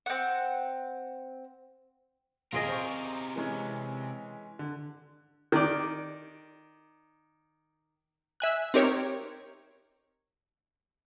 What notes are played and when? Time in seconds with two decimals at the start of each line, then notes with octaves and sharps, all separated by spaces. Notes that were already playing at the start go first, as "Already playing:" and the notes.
0.06 C4 F#5
2.53 D#1 C3 F4 G#4 A#4 D#5 D7
2.68 C5 C#6
3.36 E3 G#3 C#4
4.59 D3
5.52 D#3 D5
8.40 E5 G#5 F#6
8.74 C4 D#4 G4 A#4 C#5